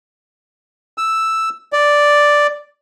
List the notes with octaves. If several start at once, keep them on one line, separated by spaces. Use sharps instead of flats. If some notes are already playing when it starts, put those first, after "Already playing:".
E6
D5